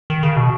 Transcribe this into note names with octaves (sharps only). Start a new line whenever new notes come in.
D#3
C#3
B2